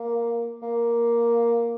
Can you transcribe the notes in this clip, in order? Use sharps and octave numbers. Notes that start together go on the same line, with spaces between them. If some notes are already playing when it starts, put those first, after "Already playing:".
Already playing: A#3
A#3